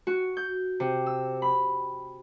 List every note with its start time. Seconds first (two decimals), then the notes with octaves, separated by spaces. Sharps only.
0.07 F#4
0.37 G6
0.80 C3
1.06 E6
1.42 B5